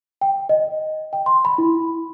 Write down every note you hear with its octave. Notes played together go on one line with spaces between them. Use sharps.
G5
D#5
G5
C6
B5
E4